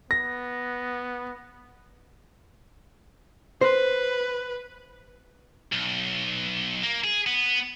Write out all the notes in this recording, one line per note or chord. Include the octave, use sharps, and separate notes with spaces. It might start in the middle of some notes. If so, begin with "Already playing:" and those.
B3 A#6
B4 C5
B1
A#3
G#4
B3